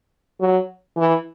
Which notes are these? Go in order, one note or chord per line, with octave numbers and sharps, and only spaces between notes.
F#3
E3